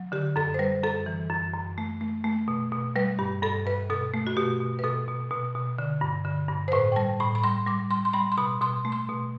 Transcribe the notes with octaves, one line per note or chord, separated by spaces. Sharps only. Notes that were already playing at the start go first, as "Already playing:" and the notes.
Already playing: F#3
D3 G4
F#2 A4
C5
G3 B4
F#2 A4
E3
F#2
F#2
A3
A3
A3
B2
B2
G3 B4
G2 G4
G2 A4
G2 B4
B2 A4
A3
F#4
B2 G4
B2
B4
B2 A4
B2
B2
B2
D3
G2
D3
G2
C5
A2 B4
G5
G3 A5
A2 B5
B5
G3 C6
G3 D6
G3 C6
C6
G3 B5
C6
B2 B5
B2 C6
A3
C6
B2